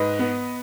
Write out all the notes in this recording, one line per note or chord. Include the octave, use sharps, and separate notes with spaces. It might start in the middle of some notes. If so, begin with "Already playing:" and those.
Already playing: G#2 B4 D#5
B3